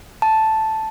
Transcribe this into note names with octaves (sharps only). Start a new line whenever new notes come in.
A5